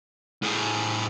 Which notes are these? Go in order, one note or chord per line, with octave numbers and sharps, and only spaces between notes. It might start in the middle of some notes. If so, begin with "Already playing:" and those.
A2 G#4